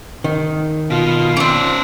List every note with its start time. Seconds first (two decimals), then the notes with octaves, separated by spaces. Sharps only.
0.24 D#3
0.90 B2 F4
1.37 A#3 C4 C#4 D5